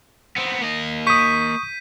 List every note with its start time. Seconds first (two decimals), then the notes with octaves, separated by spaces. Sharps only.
0.36 B3 C4
0.62 A#3 D#5
1.07 C#6 D#6 G6 B6 D#7